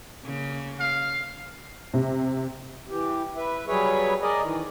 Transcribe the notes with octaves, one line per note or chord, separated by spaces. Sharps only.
C#3 A#3
F5
C3
E3 G4
B4 E5
F#3 G3 G#4 B4 C#5 E5
G#4 A#4 D5 D#5
D#3 E3